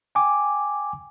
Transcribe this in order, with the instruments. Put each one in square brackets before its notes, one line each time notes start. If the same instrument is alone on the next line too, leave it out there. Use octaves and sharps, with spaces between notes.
[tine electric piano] G5 G#5 D6